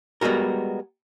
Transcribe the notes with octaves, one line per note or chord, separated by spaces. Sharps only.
G3 G#3 B3 F#4 A#4